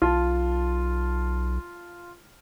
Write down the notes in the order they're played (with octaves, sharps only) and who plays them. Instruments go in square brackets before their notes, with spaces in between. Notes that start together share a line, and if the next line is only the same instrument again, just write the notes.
[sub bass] B1 [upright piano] F4 A5